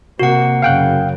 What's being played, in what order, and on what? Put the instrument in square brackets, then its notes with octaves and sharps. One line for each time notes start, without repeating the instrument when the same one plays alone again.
[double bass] C3 A#3 [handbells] F#4 F#5
[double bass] F#2 C#3 [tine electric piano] F5 G5 F#6